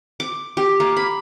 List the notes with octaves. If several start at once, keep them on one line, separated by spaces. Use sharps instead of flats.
D6
G4
A#3
B5